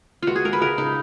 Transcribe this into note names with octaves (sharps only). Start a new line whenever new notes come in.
C#2 F4 F#4
G#4
G#3 A#4
B4
C#2 A#4
C#3 D#4